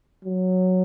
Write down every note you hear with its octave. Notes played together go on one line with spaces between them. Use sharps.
F#3